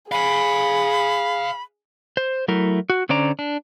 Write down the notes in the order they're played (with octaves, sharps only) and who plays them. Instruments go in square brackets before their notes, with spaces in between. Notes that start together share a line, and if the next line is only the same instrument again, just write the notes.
[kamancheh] G#4 [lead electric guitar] F5 G#5 [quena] B5
[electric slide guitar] C5
F#3 A3 E4 A#4
F#4
D3 C#4 C5 D5 A#5
D4